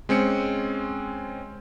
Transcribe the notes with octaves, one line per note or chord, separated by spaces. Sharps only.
G#3 C4 C#4 C#7